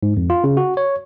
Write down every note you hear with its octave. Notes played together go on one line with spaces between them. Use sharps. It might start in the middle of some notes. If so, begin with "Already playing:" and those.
G#2
F2
F4
C#3
F#4
C#5